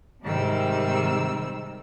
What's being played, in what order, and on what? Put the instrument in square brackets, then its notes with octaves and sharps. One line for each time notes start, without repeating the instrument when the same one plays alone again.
[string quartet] G#2 C3 D#3 G3 C4 E6